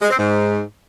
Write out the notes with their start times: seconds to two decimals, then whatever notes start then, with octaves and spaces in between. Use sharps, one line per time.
0.02 G#3
0.10 C4
0.19 G#2